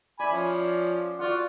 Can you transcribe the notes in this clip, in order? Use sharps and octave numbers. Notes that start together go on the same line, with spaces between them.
D5 E5 G#5 B5
F3 C#4
F4 F#4 D5 F#5